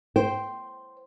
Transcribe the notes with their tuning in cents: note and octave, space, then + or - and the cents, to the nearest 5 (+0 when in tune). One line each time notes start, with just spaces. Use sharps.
C5 +0 G5 -10